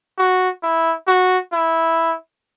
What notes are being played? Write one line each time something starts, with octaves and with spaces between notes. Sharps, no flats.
F#4
E4
F#4
E4